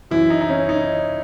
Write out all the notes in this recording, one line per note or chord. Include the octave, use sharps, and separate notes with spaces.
F#2 E3 E4
D#4
D#4
C#4
D#4